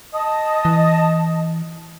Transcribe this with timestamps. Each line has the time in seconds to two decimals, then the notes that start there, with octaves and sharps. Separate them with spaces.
0.12 D#5 A5 D#6
0.65 E3